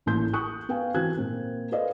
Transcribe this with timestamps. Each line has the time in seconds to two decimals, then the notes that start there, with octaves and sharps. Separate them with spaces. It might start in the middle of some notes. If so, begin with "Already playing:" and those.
0.06 A1 A#2 C6 G6
0.33 C#6 D#6 F#6
0.69 B3 B4 F5 G5 G#5
0.94 E3 C4 F#4 G#5 F#6 G#6
1.17 A#2 A#3 C4
1.72 A4 B4 C5 D5 D#5 F5